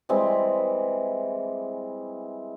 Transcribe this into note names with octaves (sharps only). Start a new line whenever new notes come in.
E3 G3 G#3 C4